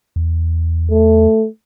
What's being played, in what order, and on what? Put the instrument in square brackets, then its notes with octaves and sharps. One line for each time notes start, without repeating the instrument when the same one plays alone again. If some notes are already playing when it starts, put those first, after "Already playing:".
[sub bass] E2
[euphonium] A3